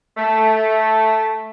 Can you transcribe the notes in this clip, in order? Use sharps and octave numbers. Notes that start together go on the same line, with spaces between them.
A3